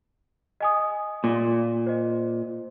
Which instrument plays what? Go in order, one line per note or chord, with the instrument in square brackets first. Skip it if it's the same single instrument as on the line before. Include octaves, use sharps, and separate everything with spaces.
[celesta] D#5 G#5 D#6
[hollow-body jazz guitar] A#2
[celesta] C5 D#5